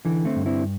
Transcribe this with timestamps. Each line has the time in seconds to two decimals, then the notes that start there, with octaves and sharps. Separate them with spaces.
0.05 D3 E3
0.25 A3 C4
0.36 G2
0.46 C4 E4